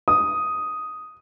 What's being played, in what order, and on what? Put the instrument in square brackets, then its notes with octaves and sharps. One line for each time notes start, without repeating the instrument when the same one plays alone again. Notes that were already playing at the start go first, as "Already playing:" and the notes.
[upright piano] D#6